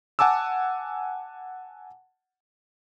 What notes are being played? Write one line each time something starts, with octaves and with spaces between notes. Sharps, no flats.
F#5 G#5 A5 D6 E6